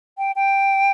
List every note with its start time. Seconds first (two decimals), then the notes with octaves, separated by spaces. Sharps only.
0.18 G5
0.36 G5